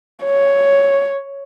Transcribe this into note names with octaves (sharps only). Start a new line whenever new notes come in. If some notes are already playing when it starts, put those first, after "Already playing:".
C#5